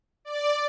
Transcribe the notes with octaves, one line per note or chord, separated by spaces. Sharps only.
D5